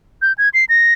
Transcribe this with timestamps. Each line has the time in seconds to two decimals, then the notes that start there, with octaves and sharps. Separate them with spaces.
0.22 G6
0.38 G#6
0.54 C7
0.69 A#6